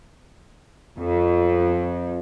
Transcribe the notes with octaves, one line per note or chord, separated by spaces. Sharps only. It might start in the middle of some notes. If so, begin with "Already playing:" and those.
F2